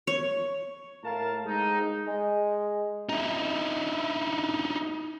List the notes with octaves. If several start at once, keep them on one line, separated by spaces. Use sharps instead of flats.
C#5
A2 A#4 F5 A5
G#3 C4 D#4
G#3
D#4 E4